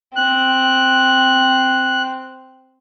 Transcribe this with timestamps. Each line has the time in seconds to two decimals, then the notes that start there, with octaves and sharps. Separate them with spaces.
0.16 C4 F#6